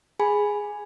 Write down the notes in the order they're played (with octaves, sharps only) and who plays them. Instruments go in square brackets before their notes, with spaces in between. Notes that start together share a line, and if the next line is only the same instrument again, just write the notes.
[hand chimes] G#4 G#5 B5